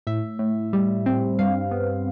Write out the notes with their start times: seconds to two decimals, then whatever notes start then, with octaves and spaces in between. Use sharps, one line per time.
0.07 A2 E5
0.39 A2
0.73 G3
1.06 C4
1.39 G2 F5
1.71 B3